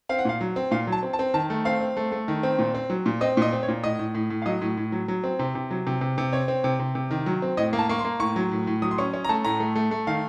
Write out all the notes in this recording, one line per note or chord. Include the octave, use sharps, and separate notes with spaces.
C4 F5
F#5
A#2 F5
F#3
C4
A#2 F5
F#3
A5
C4
A5
C4
D#3 A5
A3
C4 F5
C4
A3
A3
D#3
C4
A#2
C4
F#3
A#2
C4 D#5
A#2 D#5
C4
C#5
A#2
A2 D#5
A2
A2
A2
F5
F#3 D#5
A2
A2
F#3
F#3
C4
C3
C3
F#3
C3
C3
C3
C4 C#5
C4
C3
C3
C3
D#3
F#3
C4
A2 D#5
A#3
A5
A#3 C#6
C6
A#3
A2 C#6
F#3
A2
A2
F#3 D#6
C6
C#4 C#6
C#4
A#5
A3 A5
A2 A#5
A3
A3
A3
D#3 F5